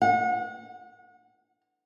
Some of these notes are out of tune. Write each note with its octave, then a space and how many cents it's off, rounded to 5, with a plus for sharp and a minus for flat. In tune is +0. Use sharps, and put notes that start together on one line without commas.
F#5 -35